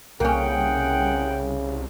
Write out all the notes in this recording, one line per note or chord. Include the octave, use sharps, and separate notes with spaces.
C2 C#3 A#3 C#4 G#4 F#5 G5